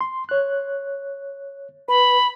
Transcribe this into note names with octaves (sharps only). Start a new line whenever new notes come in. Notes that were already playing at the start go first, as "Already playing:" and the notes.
C6
C#5 F#6
B4 B5